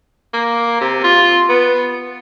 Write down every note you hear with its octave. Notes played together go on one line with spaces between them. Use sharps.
A#3
C3
F4
B3